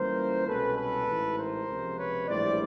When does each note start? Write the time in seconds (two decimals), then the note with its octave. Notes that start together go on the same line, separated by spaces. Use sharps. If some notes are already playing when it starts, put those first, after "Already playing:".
Already playing: C#2 C#3 E3 G3 A#3 A#4 C5
0.46 C2 B2 G#3 C#4 A4 B4
0.76 A4 B4
1.07 A1 G#2 E3
1.37 A#4 C5
1.67 C#2 C3 F3
1.97 B4 C#5
2.27 A#1 A2 E3 G3 C5 D5